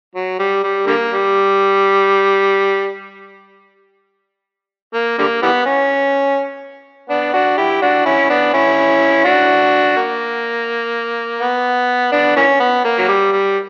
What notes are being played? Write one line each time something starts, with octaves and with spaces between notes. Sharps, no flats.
F#3
G3
G3
D3 G3 A#3
G3
A#3
D3 G3 A#3
E3 G3 B3
C#4
B3 D4
D4 F#4
E4 G4
D4 F#4
C#4 E4
B3 D4
C#4 E4
D4 F#4
A#3
B3
B3 D4
E3 A#3 C#4
B3
A#3
F#3
G3
G3